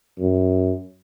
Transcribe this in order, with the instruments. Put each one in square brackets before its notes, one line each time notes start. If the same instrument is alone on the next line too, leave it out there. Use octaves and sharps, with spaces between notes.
[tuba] F#2